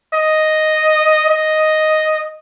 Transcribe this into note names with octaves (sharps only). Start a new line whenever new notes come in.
D#5
D#5